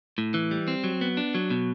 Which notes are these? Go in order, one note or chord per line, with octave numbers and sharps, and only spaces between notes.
A2
E3
G3
C4
F#3
B3
D4
F#3
B2